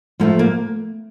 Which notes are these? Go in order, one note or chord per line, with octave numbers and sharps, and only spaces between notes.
F3 A3 A#3
A#3